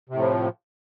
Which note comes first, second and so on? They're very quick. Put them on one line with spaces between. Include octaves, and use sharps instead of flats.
C3 A2 F3